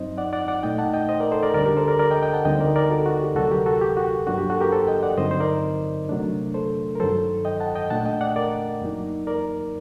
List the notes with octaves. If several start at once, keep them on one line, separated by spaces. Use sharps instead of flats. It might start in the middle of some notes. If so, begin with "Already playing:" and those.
Already playing: G2 F#3 C4 D#4 C5 D#5
D5 F#5
D5 F#5
D5 F#5
A#2 A3 D#4 D#5 G5
F#5 A5
D#5 G5
C5 D#5
A#4 D5
A4 C5
A#4 D5
D2 D3 G3 D4 A#4 D5
G4 A#4
A4 C5
A#4 D5
A#4 D5
D#5 G5
D#5 G5
F#5 A5
D2 D3 G3 C4 D#4 D#5 G5
C5
A#4 D5
A#4 D5
F#4 A4
F#4
G4
D2 C3 F#3 F#4 A4
G4 A#4
F#4 A4
G4
F#4
G2 F#3 A#3 D4 F#4
G4
F#4 A4
G4 A#4
A4 C5
D#5 G5
D5 F#5
G2 D3 F#3 C4 D#4 C5 D#5
C5
A#4 D5
C3 F#3 A3 D4
A4 C5
A#4
G2 D#3 F#3 A4 C5
D#5 G5
F#5 A5
D#5 G5
A#2 A3 D4 F#5 A5
D#5 G5
D5 F#5
A#4 D5
F#2 F#3 A#3 D#4
A#4 D5